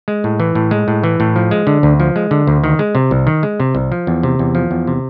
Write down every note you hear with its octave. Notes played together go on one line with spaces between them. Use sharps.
G#3
A2
E3
A2
G#3
A2
E3
A2
F3
G#3
D3
D2
F3
G#3
D3
D2
D#3
G#3
C3
C2
D#3
G#3
C3
C2
F3
E2
C3
E2
F3
E2
C3